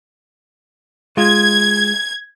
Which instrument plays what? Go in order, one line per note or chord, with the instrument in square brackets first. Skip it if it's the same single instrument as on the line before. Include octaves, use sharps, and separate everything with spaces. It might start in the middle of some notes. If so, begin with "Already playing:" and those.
[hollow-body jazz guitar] G#3 F4 [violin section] G#6